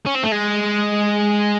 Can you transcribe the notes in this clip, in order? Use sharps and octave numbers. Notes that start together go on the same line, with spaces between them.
C#4
C4
A3
G#3